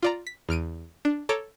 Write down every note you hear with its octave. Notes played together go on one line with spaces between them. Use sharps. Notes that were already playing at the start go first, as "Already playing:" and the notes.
F4 D5 A#5
B6
E2 F6 D7 D#7
D4
A4 C#5 A#5 D6 D7